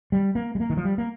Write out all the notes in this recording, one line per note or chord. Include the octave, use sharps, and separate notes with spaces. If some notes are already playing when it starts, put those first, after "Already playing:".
G3
A#3
G3
A#3
D#3
F3
G3
A#3